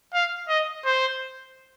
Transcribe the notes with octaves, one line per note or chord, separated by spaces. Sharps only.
F5
D#5
C5